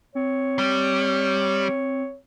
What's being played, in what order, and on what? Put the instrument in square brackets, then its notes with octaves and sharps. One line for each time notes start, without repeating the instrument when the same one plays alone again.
[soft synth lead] C4 [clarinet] C#5
[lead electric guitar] G3